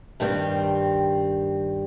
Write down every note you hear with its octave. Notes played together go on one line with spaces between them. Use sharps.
G2 D#3 G3 C4 G4